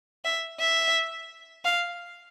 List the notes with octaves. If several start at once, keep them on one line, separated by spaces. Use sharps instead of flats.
E5
E5
F5